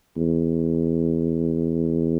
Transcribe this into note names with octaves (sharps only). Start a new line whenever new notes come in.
E2